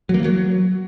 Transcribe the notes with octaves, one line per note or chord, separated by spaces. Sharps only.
F#3
A#3
E3
F#3